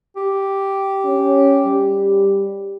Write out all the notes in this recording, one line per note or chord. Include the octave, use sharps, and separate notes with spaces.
G4
C#4
G3